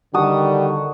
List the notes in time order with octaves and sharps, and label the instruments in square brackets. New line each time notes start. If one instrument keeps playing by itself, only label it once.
[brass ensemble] D3 D#3 [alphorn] G3 [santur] F#4 A5 D#6